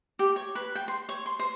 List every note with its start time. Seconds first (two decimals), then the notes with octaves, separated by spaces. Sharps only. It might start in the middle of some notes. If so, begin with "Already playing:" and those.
0.19 G4
0.36 C#5
0.55 B4
0.75 G5
0.88 C6
1.09 C#5
1.26 C6
1.39 C5